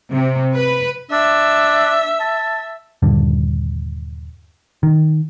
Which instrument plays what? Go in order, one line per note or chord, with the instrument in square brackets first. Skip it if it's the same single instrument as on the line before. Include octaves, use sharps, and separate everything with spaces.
[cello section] C3
B4
[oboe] D4 [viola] E5
[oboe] A5
[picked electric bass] D#1 G2 D3
D#3